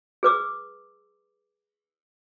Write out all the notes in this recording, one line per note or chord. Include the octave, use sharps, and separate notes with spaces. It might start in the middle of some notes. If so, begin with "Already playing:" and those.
G#4 B4 D6 E6